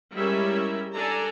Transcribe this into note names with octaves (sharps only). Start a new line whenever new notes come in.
G3 G#3 C#4 E4 A#4 E5
D4 A4 D5 G#5 A#5